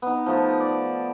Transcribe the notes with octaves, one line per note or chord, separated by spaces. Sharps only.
B3 D#4
F3 A3 D#4
D5